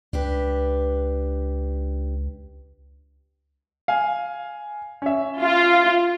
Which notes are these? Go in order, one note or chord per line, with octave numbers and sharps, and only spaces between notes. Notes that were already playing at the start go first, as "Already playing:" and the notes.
C#2 D4 G4 B4
F5 G#5
C#4 E5
F4